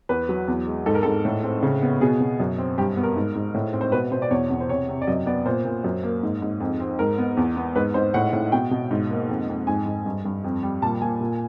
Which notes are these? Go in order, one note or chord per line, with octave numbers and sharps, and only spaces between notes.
E2 B4
F#3
E2
G#3
G#2 A4
A#4
G#2 A4
A2
C4
C#3
B3
B2 G#4
B2
F#2
C4
G2 G4
B3
A#4
G#2
G#2
A2
C4
C5
B2 B4
B2 C5
D5
E2 C#5
E2
C5
C3 C#5
C3
D5
F#2 D#5
B3 D5
A#2 C5
A#2
F#2
A#3
G#2
G#2
F2
C4
G#2 A#4
B3
E2
B3
G#2 B4
G#2 C5
A2 F#5
A2
B2 G5
B2
G#2
A#3
F2
F2
G#2 G#5
G#2
G2
G2
F2
G3
A#2 A5
A#2 G#5
A#2